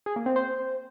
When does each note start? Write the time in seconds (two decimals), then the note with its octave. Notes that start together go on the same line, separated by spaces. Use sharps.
0.06 G#4
0.16 A#3
0.26 C4
0.36 C5